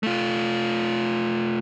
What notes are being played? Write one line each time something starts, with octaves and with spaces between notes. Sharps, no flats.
A3 F4